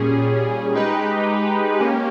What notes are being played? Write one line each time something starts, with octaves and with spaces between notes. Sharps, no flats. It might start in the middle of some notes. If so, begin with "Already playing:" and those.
Already playing: A#2 G3 C#4 G#4
G#3 D#4 G4 B4
A#3 C#4 G4